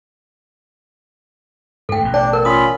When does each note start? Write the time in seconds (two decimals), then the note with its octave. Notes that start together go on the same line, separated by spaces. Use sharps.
1.89 G#2 A3 A4 G5
2.01 A1 B2
2.14 D4 D5 G5
2.33 A4 A#4
2.45 C#4 F4 B5 D#6